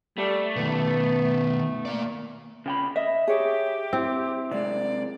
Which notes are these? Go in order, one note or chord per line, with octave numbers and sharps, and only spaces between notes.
G3 A3
B2 D#3 B3
A#3 D5
C#3 G5 B5
D#5 E5
G4 G#4 C#5
C4 E4
C3 G#3 D5